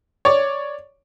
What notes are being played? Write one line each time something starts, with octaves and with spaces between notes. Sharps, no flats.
C#5 D5